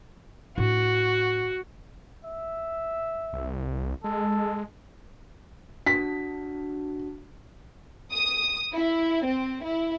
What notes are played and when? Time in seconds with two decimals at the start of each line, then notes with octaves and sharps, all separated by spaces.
0.58 A2 D4 F#4
2.24 E5
3.33 C2
4.04 G#3 A4
5.86 D4 F#4 B6
8.12 D#6
8.74 E4
9.26 C4
9.64 E4